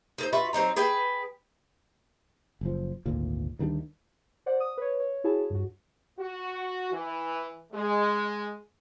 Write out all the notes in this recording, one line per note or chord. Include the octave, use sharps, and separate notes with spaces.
D#4 A4 C5
F4 F#4 B4 E5
F#3 C4 D#4 A#5
G#4 B4 G5 A5
F#1 F3
G#1 D2 A#2
D2 D#3 G3 D4
C5 D5 F#5
D#6
B4 C#5
C#5
E4 F#4 G#4 C#5 A5
G2 F#4
F#4
E3
G#3